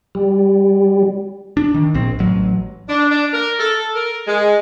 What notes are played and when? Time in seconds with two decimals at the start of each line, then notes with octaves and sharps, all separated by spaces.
0.15 G3
1.57 D4
1.74 D#3
1.94 A#1 C4
2.19 A1 F#3
2.88 D4
3.10 D4
3.33 A#4
3.59 A4
3.95 A#4
4.27 G#3